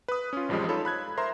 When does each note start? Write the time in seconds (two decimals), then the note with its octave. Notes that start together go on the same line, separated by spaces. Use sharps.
0.08 B4 D#6
0.33 C#4 F4
0.49 A1 F2 F3 G3 G#3
0.68 D#4 F4 A4 C#5 B5
0.85 B5 F#6 G#6
1.17 A#4 C5 E5 A#5 C6